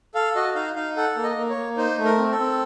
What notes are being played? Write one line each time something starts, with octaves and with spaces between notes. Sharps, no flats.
A4 F5
F#4 D#5
D#4 F5
D#4 F5
A4 F#5
A#3
D#5
A#3
C#5
A#3
D#4 C5
A3
A#4
C4
A4
C4